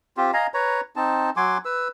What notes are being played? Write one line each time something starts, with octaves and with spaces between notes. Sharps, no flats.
C4 F4 G4
D#5 F5 G#5 A#5
B4 C#5 A#5
C4 D#4 A5
F#3 G#5 C6 D6
B4 E6